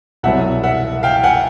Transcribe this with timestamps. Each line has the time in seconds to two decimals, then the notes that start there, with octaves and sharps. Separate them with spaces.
0.23 C2 B2 F#3 E5 F#5
0.64 E5 F#5
1.03 F5 G5
1.23 F#5 G#5